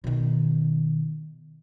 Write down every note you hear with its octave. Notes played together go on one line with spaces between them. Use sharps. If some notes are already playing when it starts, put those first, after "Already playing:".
B2 D#3